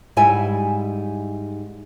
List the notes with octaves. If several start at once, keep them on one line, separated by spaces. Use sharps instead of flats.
G#2 G3 E4 G#5